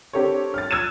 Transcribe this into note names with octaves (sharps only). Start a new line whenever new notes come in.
C4 D4 G4 A4 A#4 C#5
F6 A6
E6 F#6 G#6 A6 D#7 E7